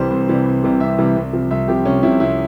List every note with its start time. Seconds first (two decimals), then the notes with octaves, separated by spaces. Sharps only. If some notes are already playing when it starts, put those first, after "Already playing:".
Already playing: C2 C3 E3 G3 C5
0.10 C2
0.28 C3 E3 G3
0.46 C2
0.63 C3 E3 G3
0.80 C2 E5
0.98 C3 E3 G3
1.16 C2
1.33 C3 F3
1.51 C2 E5
1.68 C3 F3 G4
1.85 C2 C#4
2.03 C3 F3 E4
2.20 C2 E4